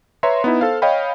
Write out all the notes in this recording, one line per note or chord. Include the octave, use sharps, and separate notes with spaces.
B4 C#5 E5 A#5 C6
B3 D#4 E4
A4 C5 F5
C#5 D#5 F5 G5 B5